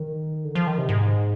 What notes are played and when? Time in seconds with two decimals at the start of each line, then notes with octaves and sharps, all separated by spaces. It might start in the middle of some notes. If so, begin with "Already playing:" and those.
Already playing: D#3
0.45 D3
0.55 F3
0.67 D#3
0.78 C3
0.89 G#2